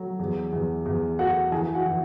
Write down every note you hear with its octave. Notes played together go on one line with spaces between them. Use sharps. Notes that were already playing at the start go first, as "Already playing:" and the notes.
Already playing: F#3 A3
E2
E2
E2
A3 F#4 F#5
E3 G#4 G#5
F#4 F#5
E3